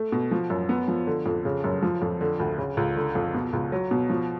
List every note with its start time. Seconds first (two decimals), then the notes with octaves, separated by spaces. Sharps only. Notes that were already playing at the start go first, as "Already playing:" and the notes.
Already playing: A3
0.12 B2
0.31 F3
0.50 F#2
0.69 B3
0.88 F3
1.07 D3
1.26 F2
1.45 C#3
1.64 F#2
1.82 F3
2.02 F2
2.21 D3
2.40 D2
2.58 C#3
2.77 C#2
2.96 D3
3.15 F2
3.34 B2
3.53 C#2
3.72 F#3
3.91 B2
4.10 F3